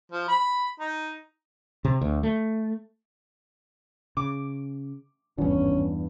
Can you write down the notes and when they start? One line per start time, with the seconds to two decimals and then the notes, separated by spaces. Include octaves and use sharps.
0.12 F3
0.28 B5
0.80 D#4
1.85 C3
2.01 D2
2.23 A3
4.17 C#3 D6
5.38 D1 G#1 E2 G2 C#4